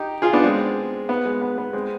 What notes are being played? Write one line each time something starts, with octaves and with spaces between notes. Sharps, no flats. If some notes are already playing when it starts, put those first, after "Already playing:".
Already playing: D#4 G4
F4 G#4
B3 D4
G#3 C4
B3
G#3
B3
B3
G#3 C4